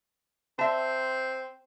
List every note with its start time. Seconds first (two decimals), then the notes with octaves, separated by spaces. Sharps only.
0.59 C4 E5 A5